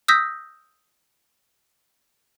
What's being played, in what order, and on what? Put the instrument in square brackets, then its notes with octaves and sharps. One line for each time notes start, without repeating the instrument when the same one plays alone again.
[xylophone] D#6 E6 G6 A#6 B6